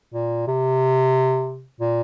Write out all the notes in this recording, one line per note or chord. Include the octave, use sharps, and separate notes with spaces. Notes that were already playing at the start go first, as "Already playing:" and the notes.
A#2
C3
A#2